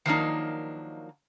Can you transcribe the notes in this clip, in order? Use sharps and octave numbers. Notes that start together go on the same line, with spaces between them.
D#3 F3 F#3 A#3 D4 D#4